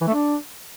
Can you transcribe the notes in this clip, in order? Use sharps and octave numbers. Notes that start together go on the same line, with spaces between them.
E3
A3
D4